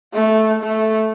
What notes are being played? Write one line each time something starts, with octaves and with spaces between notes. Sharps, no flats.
A3
A3